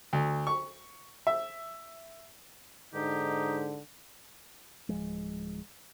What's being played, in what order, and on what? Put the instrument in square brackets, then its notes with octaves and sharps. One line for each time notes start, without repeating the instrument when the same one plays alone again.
[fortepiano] D2
C#6
E5
[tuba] G#2 [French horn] D3 [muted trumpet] D#4 [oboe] G4
[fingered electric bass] D1 F3 G#3